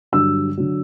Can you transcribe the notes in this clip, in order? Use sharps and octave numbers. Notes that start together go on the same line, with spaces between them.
G2 D3 F#3 E6
D3 F#3